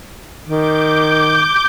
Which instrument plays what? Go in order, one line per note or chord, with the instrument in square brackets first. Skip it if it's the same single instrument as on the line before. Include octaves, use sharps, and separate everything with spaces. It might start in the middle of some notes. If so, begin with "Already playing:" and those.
[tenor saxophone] D#3 [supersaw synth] D6 G6